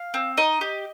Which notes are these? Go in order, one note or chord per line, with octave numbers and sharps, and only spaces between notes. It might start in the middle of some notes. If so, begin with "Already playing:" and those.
Already playing: F5
C4
D#4 D#5
G4